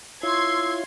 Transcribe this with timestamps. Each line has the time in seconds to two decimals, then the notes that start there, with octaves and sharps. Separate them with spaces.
0.23 E4 F4 C#5 C6 E6 G#6